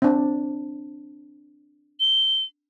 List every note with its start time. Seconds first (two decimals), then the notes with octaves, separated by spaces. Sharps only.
0.02 C4 D4
2.00 G7